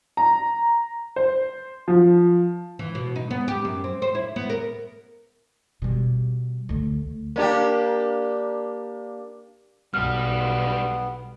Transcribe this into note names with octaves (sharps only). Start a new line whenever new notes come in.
A#5
C5
F3
E3
B2
D#4
B3
G4
F#2
C4
C5
E4
B3
A#4
B2 G3
D2 A3
A#3 D4 G4
B1 G3 B3 B4 F6